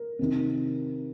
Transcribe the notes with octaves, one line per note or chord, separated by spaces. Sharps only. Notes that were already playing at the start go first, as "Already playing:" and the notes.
Already playing: A#4
C3 D#3 C4 D#4